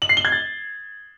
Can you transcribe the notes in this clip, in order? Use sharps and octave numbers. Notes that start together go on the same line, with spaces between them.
F#7
C7
G7
G#6
A6